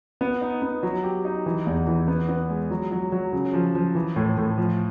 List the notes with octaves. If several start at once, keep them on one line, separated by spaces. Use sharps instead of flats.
B3
D#4
B3
F#3
G4
D#4
E3
E2
E3
B3
B3
G#3
F#3
F#3
F#3
C#3
F3
F3
E3
A2
A2
F3